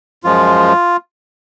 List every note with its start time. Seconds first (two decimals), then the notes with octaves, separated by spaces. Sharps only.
0.24 F#2 F3 G#3 F4